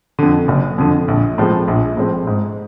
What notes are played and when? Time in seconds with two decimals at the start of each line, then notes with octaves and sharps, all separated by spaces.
0.19 F2 D3
0.48 F#1
0.78 F2 D3
1.08 A#1
1.38 A2 F3 G#3 C4
1.68 A#1
1.97 A2 F3 G#3 C4
2.27 G#2